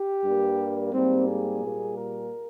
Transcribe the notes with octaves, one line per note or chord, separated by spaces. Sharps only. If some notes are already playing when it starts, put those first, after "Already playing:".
Already playing: G4
G2 G3 A#3
G#2 G3 A#3 C4
G#4
A#2 G3 A#3
A#4